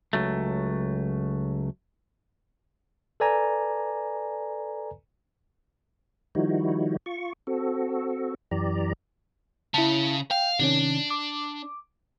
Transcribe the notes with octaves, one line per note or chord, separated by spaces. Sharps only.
C#2 F#3 A3
A4 B4 D5 G#5 A#5
D#3 F3 G3 D#4 E4 F#4
F4 C#6
C4 F#4 A4
F#2 E3 G4 D5 A#5
C#3 E4 A5
F5 G5
C3 D#3 C#4 D4
D6